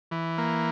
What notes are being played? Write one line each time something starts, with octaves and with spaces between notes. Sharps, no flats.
E3
A#3